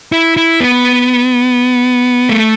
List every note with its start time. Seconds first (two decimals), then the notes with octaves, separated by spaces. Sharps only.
0.12 E4
0.37 E4
0.60 B3
2.29 A3